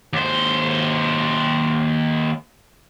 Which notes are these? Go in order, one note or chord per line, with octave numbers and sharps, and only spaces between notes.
D#2 C5